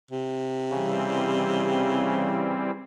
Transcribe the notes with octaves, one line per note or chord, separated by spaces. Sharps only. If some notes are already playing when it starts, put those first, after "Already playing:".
C3
C#3 E3 G3 C4